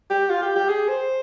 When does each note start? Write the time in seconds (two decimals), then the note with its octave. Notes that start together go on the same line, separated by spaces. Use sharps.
0.10 G4
0.29 F4
0.43 G4
0.56 G4
0.69 G#4
0.88 C5